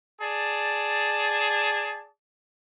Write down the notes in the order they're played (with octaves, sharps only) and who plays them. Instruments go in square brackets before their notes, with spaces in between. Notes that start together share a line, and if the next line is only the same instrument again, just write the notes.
[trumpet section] G#4 D5 A5